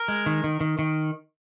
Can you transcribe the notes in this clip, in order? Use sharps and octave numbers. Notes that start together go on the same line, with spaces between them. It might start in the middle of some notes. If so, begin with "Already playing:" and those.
Already playing: A#4
G#3
D#3
D#3
D#3
D#3